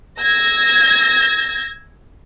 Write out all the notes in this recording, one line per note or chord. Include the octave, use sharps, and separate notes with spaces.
E6 G#6 A#6